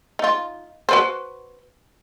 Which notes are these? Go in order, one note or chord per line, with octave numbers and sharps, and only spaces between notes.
D#4 F4
F#4 B4 C5